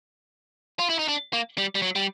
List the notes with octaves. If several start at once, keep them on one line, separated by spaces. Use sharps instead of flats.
F4
E4
D#4
D4
A#3
G3
G3
F#3
G3